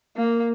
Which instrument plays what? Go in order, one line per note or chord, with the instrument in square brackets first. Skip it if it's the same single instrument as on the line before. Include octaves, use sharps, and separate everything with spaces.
[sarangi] A#3